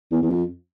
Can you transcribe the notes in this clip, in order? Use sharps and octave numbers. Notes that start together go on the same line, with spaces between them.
E2
E2
F2